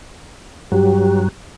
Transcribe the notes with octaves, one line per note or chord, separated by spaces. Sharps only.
G2 F#3 G4